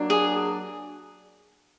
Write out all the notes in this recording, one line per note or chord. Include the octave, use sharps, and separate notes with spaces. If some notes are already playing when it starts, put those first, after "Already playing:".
Already playing: F#3 A#3 D4
G#4